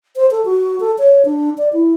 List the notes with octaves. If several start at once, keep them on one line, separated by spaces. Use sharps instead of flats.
C5
A4
F#4
A4
C#5
D4
D5
E4